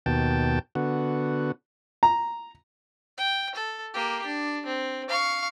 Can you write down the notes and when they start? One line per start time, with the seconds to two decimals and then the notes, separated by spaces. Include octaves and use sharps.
0.06 D#2 B2 G5 A5
0.75 D3 B3 F#4
2.03 A#5
3.17 G5
3.55 A4
3.94 A#3 G4
4.26 D4
4.66 C4
5.08 F5 C#6